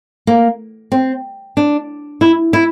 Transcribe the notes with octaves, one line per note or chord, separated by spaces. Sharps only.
A#3
C4
D4
E4
E4